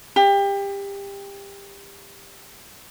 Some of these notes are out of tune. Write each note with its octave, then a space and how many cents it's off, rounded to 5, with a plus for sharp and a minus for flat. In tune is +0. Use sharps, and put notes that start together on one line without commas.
G4 +25